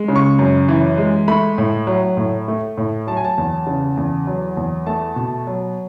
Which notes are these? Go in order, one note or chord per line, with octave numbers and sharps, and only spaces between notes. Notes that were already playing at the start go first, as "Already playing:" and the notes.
Already playing: G#3
C#3
C#6
F#2
E3
G#3
A3 B5
A2
F#3
A2
A3
A2
F#3 A5
G#5
A5
E2
C#3
E2
F#3
E2
A3 A5
B2
F#3